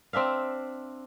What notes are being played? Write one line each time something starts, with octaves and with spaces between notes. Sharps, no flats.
C4 D4 E5 F5